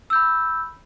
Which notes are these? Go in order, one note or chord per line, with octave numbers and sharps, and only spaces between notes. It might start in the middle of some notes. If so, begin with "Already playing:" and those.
B5 E6 G6